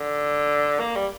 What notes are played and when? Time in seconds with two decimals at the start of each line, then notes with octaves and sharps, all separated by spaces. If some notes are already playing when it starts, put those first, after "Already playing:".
Already playing: D3
0.80 A#3
0.96 G3